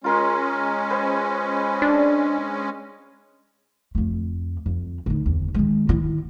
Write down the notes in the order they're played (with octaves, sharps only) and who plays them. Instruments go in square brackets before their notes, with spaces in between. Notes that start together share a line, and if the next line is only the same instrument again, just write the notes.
[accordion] G#3 C#4 [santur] F4 A#4 C6
[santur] B4 C5 G#5
[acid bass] D4
[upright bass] F2 A3
F2
D2 D#4
F#1 E2
D#3 G#3
D#3 E4